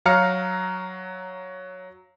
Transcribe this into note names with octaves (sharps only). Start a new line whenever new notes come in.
F#3 F5 A#5 F6 C#7